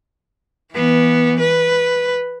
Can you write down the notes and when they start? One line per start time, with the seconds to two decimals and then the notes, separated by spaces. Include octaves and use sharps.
0.73 E3 B3
1.40 B4